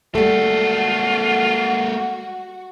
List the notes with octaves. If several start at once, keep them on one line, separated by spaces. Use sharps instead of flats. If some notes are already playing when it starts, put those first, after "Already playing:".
G3 A3 A#3 F4 F#4 A4